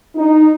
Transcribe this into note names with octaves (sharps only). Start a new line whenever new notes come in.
D#4